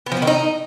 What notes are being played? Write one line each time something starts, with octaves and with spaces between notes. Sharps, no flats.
B3
F3
B3
D#3
D#4